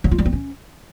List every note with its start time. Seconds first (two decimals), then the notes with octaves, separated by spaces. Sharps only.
0.04 F#3
0.11 F4
0.18 G3
0.26 C4
0.33 C#4